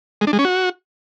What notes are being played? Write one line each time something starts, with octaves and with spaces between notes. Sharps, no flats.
G#3
D4
G#3
C#4
F#4